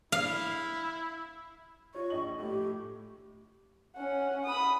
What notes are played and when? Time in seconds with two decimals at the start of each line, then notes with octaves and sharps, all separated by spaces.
0.12 E4 F5
1.95 F4 C#5 C#6
2.10 A#1 D#5 F#7
2.39 A2 G4
3.96 C#4 F#5
4.46 B5 D#6